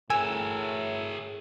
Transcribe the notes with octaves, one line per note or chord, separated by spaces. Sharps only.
A2 G#4 A#4 G#5 E6